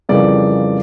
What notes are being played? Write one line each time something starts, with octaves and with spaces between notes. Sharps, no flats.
F2 C#3 E3 G3 A#3 D5